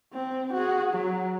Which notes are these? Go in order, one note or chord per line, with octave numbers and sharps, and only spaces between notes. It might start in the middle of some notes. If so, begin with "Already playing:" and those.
C4
F#4 G#4
F#3